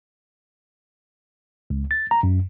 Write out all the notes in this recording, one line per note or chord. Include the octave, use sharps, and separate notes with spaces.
C#2
A6
A#5
F#2